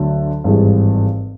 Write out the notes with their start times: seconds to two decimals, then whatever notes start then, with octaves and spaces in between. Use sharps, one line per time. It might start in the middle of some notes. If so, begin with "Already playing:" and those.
Already playing: D2 D3 F#3
0.44 G#1 G2 E3 G#3